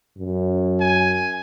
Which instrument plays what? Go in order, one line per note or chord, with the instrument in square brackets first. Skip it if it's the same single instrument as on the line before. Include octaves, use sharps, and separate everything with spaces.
[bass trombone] F#2
[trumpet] G#5